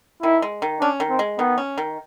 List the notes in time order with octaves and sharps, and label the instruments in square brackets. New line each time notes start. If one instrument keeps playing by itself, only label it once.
[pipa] D#3 [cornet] E4
[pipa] G#3
D#3
[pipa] C#4 [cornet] D4
[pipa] D#3
[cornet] C4
[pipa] G#3
[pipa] D#3 [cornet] B3
[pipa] C#4
D#3